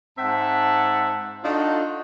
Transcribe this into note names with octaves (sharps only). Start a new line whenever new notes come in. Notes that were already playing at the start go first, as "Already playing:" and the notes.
G#2 C4 E5 F#5 A5
D4 D#4 F4 F#4 A4